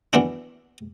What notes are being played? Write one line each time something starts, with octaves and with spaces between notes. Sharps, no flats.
B2 E3 B3 D4 E4